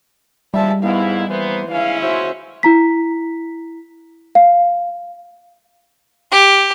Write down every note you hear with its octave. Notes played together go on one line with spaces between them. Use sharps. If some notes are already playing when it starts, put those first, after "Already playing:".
F3 G3 G#3 E5 A5
G#2 B3 E4 F5
E3 A#3 B3 C5
G#3 C#4 E4 F5
C#2 F#4 C5 E5
E4 A#5 B6
F5
G4